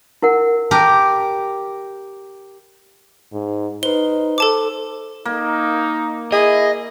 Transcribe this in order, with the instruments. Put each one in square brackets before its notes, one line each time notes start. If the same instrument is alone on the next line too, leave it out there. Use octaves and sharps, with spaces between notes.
[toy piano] E4 A#4 F#5
[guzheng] G4 A#4 [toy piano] A5
[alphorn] G#2
[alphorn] D#4 [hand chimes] B4 C5 [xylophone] G7
[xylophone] A4 A5 D6 [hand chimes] C5
[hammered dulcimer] A#3 [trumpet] D#4
[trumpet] E4 [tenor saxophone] G#4 [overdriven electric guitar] D#5